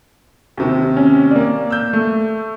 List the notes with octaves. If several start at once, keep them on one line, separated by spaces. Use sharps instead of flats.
D#2 C3 D#3
C#4
A#3 D5
E6 G6
A3